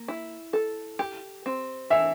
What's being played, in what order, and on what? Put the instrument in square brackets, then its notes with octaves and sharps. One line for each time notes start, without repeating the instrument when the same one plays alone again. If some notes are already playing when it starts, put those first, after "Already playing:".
Already playing: [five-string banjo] A#3
E4
A4
G4
C4
[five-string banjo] E3 [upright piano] E5